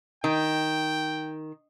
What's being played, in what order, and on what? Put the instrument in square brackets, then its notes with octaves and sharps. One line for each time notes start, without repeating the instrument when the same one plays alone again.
[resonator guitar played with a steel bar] D#3 [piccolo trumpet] G5